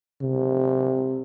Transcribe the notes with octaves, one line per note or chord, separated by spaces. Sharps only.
C3